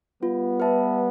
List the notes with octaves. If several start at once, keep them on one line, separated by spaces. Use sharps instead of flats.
G3 B3 F4
B4 E5 A5